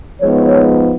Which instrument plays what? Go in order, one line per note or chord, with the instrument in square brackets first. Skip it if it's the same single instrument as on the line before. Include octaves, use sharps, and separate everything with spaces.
[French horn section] F3 G#3 B3 D#4 C#5